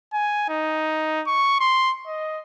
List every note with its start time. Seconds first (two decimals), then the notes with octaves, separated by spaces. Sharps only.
0.13 G#5
0.49 D#4
1.27 C#6
1.60 C6
2.07 D#5